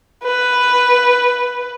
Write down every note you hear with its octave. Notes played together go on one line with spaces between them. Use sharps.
B4